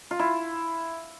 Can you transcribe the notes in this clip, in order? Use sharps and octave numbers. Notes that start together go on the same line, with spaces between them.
F4
E4